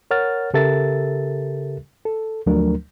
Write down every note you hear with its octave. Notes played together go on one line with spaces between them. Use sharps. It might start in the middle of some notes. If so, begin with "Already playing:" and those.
A#4 C#5 F#5 F6 A6
C#3 G4 A4 A#4 E5 A6
A4
D2 F3 F#3 A3 D4 A#4